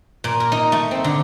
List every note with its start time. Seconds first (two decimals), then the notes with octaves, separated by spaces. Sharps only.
0.24 A#2
0.40 A#4
0.52 D#4
0.72 A3
0.91 C4
1.04 D3